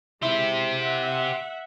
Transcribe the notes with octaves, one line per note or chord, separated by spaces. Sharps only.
G#3 E4 G4 C5
E5 F#5